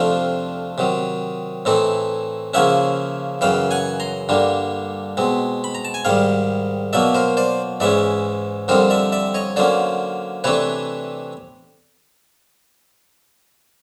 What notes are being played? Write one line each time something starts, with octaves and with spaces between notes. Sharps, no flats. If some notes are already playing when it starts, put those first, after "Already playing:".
Already playing: F2 C3 F3 A3 D4 F5 G5
C3 D#3 F#3
A2 E3 A3 C4 D#4
C#3 F3 A#3 C#4 E5 F#5
F#2 C#3 E3 F5 G5
F#5 G#5
A#5 C6
G2 D3 G3 A#3 D4
B2 G#3 C4
B5
A#5
A5
G#5
G#2 D#3 G3 F5 G5
B2 F#3 A#3 D5 E5
A#4 C5
C5 D5
G#2 E3 G#3 C#4 D5 E5
F2 D3 G3 C4 D#4 A#4 C5
D5 E5
D5 E5
C#5 D#5
D3 F#3 A#3 C#4 C5 D5
C3 E3 A3 D4 B4 C#5